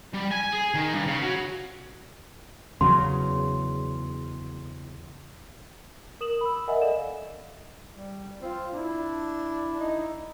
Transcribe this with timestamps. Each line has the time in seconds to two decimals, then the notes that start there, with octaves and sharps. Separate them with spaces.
0.13 G3
0.31 G#5
0.52 G#4
0.74 D#3
0.94 G2
1.07 C#3
1.22 F#3
2.81 E2 C#3 F#3 C6
6.21 A#4 D#6 E7 F#7
6.41 B5 E6
6.68 A#4 D#5 E5 F#5 G#5
6.81 A4 D5 D#5 F5 E7
7.93 G3
8.42 C4 F4
8.73 D4 E4
9.80 D#4